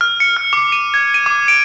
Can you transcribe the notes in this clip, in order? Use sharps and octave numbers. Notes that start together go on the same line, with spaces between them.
F6
C#7
F6
D6
D#7
G#6
D#7
D6
D7